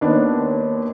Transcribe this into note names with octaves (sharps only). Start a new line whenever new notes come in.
D#2 B3 D4 D#4